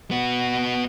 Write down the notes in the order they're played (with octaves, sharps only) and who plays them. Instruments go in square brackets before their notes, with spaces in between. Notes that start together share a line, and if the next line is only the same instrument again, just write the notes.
[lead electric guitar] B3 F#4